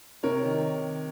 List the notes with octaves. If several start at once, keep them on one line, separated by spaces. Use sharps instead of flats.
C3 A#4 C#5
D#3